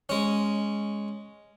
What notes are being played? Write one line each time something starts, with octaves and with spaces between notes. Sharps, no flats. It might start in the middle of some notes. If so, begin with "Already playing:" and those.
G#3 C#4